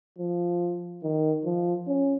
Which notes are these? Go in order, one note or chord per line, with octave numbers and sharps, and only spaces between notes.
F3
D#3
F3
C#4